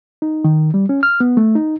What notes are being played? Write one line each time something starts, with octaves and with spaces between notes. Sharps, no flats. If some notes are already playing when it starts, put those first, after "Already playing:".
D#4
D#3
G3
C#4
F6
B3
A3
D#4